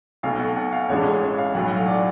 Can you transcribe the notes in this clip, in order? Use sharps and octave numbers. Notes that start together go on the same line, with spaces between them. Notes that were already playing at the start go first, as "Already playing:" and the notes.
B1 B2 A3 F5
F#5
F#5
F5
A1 A2 G#3 D4 C#5
C#5
C#5
F5
B1 A2 F#3 F#5
F#5
F5
D5